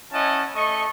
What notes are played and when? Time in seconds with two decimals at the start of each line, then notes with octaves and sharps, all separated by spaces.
0.12 C#4 E4 D#5 F#5 A5
0.54 A3 D#5 C#6